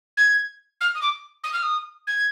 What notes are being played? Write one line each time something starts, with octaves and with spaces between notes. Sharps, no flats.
G#6
F6
D#6
D6
D#6
F6
D#6
G#6